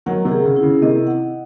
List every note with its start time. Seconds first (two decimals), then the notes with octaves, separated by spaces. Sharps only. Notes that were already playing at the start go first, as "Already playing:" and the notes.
0.06 D#3 F#3 F#5
0.25 C3 D#3
0.31 G#4
0.44 C#3
0.56 E4
0.63 C#3
0.82 C3 D#3 D#5
1.07 F#5